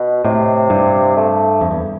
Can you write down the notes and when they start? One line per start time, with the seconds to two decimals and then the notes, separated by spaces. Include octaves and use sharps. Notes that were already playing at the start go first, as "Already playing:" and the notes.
Already playing: B2
0.24 A2 C3
0.70 G2
1.16 A3
1.61 F2
1.71 E2